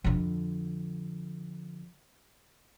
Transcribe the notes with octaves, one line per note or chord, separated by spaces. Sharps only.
F2 D3